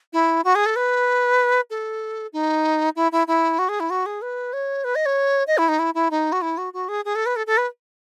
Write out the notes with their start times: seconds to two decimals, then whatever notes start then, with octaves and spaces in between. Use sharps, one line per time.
0.13 E4
0.44 F#4
0.55 G#4
0.66 A4
0.76 B4
1.70 A4
2.33 D#4
2.96 E4
3.12 E4
3.27 E4
3.59 F#4
3.69 G#4
3.80 E4
3.90 F#4
4.06 G#4
4.22 B4
4.53 C#5
4.84 B4
4.95 D#5
5.06 C#5
5.47 D#5
5.58 E4
5.69 D#4
5.79 E4
5.95 E4
6.11 D#4
6.32 F#4
6.42 E4
6.58 F#4
6.73 F#4
6.89 G#4
7.05 G#4
7.15 A4
7.26 B4
7.36 A4
7.47 A4
7.57 B4